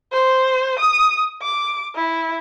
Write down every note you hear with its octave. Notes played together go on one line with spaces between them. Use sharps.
C5
D#6
D6
E4